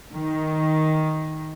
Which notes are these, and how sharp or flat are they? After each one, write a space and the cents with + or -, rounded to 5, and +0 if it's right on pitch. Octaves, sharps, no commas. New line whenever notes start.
D#3 +5